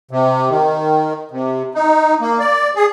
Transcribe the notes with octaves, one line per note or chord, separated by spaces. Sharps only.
C3
D#3
C3
D#4
A#3
D5
G#4